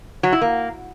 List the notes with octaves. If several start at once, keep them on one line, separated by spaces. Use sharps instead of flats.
F#3
E4
A#3